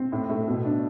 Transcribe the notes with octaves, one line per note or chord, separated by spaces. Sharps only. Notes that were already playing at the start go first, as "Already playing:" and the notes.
Already playing: C4
A2
A3
B2
D4